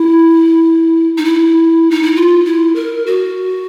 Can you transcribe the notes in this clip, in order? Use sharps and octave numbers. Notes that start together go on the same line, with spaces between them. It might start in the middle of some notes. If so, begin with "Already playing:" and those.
Already playing: E4
D#4
E4
D#4
E4
F4
E4
A#4
F#4